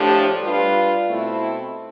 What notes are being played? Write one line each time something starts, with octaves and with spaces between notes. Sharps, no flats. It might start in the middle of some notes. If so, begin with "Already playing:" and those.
Already playing: A2 F3 A3 D4 G4
G3 D4 F4 B4
B2 A3 C4 E4